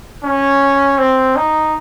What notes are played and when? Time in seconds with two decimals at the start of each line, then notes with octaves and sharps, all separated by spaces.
0.23 C#4
0.98 C4
1.36 D#4